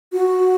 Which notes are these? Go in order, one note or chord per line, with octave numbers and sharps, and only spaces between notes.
F#4